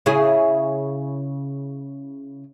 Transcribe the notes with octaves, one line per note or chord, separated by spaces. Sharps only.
C#3 E4 G#4